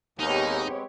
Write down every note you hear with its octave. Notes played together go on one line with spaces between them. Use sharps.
D#2 G#3 B3 C4 D#4 G4 C#5